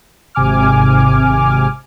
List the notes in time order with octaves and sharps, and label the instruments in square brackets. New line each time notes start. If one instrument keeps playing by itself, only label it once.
[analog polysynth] G#1 C3 G#5 D6 F6